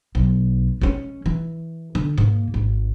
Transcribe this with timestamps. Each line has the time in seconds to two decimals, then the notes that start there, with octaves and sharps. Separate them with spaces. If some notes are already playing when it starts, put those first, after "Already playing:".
0.15 B1
0.81 G#3 C#4
1.26 E3
1.95 D3
2.18 G#2 A#3
2.54 G#1